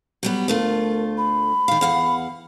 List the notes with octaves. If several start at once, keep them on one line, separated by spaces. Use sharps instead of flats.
F#3 G3 B3
D2 A3 F4 A#4
B5
D#3 F5
E2 F5 F#5